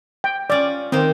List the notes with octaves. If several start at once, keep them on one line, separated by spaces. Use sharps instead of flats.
G5
C#4 F4 D5
D#3 A#3 C4 D#4